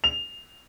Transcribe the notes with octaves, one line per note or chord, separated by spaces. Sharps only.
F7